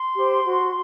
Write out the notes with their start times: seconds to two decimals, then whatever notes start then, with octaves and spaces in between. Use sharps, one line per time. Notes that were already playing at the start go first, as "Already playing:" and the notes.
Already playing: C6
0.15 G4 C5
0.46 F#4